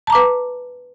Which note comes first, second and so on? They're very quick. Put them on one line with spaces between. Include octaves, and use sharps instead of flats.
A5 A#5 D6 B4